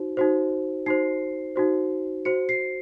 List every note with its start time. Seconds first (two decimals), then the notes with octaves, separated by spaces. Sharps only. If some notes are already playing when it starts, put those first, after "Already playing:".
Already playing: D#4 F#4 C5
0.17 D#4 F#4 C5
0.86 D#4 F#4 C5 C7
1.56 D#4 F#4 C5
2.25 F#4 C5 C#7
2.49 C7